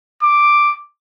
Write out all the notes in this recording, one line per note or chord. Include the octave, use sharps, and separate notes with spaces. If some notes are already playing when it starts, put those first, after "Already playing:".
D6